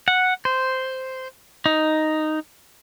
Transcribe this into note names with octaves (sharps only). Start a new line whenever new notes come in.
F#5
C5
D#4